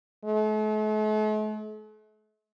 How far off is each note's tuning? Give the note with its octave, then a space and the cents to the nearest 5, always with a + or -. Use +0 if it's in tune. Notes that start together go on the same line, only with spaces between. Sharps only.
A3 -45